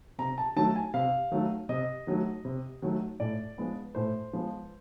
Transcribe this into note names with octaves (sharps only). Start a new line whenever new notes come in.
C3 A#5
A5
D#3 F#3 A3 A5
G#5
C3 F5
D#3 F#3 A3
C3 D#5
D#3 F#3 A3
C3
D#3 F#3 A3
A2 D5
F3 G#3 B3
A2 C5
F3 G#3 B3